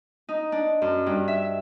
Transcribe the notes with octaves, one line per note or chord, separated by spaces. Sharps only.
D#4
D4
F#2
G2
E5